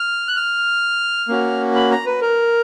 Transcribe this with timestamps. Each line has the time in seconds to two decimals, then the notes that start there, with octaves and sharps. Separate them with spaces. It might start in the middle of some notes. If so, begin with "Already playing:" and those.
Already playing: F6
0.28 F#6
0.36 F6
1.28 A#3 C#4 F#4
1.75 B5
1.91 A#5
2.06 B4
2.22 A#4